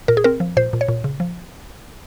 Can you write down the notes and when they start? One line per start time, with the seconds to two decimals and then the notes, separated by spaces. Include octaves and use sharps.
0.08 A#2 A#4
0.17 G#4
0.24 C4 A#4
0.40 F3
0.57 A#2 C5
0.73 A#2
0.81 C#5
0.88 A#2
1.04 C#3
1.20 F3